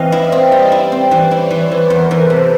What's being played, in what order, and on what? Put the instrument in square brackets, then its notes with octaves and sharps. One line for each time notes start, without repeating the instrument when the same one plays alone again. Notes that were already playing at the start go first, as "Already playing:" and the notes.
Already playing: [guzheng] E3 C4 [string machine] D#5 F5
[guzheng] E4 [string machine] D5 E5
[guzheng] C4
[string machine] C5 D5
[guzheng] G3
E4
C4
E3
[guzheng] E4 [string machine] B4 C#5
[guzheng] E3
E3
[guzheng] E2 [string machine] A#4 C5
[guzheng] E3
[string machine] A4 B4
[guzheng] C3